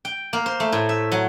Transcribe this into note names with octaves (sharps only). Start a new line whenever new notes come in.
G5
A#3
C5
A3
A2
E5
F#3